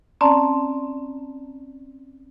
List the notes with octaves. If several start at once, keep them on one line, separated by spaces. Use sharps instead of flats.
C4 C#4 D5 A5 A#5 C6